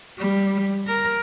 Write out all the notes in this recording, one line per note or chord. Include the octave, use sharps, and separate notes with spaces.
G3
A#4